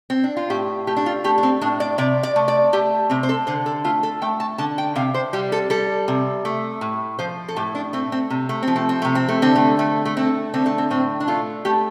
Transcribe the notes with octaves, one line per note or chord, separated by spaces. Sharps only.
C4
D4
F4
A2 G4
A3 G4
D4
F4
A3 G4
D4
C4
A2 D4
D5
C3 D5
D5
A3
D5
A3 G4
C3 C4
C5
A4
D3 C5
A4
A3 F4
A4
A3 G5
A5
D3 A5
G5
C3 F5
C5
G3 G4
A4
G3 A4
C3
A3
A2
F3 C5
A4
A2 G4
D4
A3 C4
C4
C3
A3
F3 C4
A3
C4
C3 A3
C4
A3
D3 C4
A3
A3
A3
A3 C4
D3 C4
A3
C4
A2 C4
D4
A3 F4
A3 G4